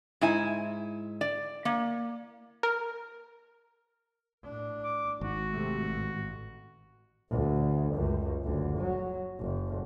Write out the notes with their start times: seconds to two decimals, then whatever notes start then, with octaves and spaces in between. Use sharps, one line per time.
0.21 G#2 E4 G#5
1.21 D5
1.65 A#3
2.63 A#4
4.44 A2 D4
4.83 D6
5.21 G#1 F#4
5.51 C3 A3
5.86 A1
7.30 D2
7.95 C#2 F#2
8.44 F#1 D2
8.78 F#3
9.40 F#1